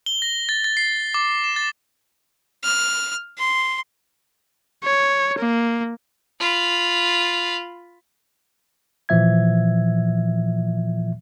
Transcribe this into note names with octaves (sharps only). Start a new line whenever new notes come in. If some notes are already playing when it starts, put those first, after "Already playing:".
G7
A#6
A6
A6
C7
D6
E7
A6
F6
C6
C#5
A#3
F4 B5
A#2 E3 F3 E5 G#6